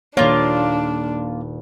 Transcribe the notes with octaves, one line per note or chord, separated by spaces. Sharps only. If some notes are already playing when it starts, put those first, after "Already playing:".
D#1 A#3 D4 F4 C#5 F6